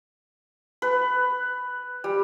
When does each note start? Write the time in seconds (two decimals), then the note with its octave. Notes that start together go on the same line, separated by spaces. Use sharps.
0.82 B4
2.04 G3